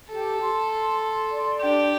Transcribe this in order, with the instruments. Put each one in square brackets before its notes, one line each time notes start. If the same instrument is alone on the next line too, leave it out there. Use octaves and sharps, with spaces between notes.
[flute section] G4 [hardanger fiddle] A4
[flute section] C6
C6
C6
D5
[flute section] D4 [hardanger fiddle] G4